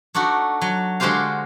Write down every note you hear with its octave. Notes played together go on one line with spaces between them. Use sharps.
A3 D4 D#4 F#4
F#3
D3 G#3 F#4 G4 C5 F5